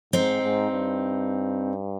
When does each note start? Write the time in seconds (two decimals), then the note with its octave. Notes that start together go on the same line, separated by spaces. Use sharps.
0.13 G#2 C4 D#4
0.43 G#2
0.72 G2